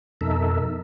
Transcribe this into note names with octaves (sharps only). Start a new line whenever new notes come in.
F2 B2 D#4 A4 A#4 E5